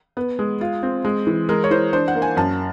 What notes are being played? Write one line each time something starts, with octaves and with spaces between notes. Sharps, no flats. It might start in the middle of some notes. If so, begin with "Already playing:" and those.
B3
G#3
F4
C4
G#3
E3
G#3 A#4
C#5
E3 C5
D4 C5
F#5
A#3
G#5
F#2 A5